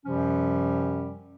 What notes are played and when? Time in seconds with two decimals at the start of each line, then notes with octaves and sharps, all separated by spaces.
0.06 F#2 C3 F3 G3 C#4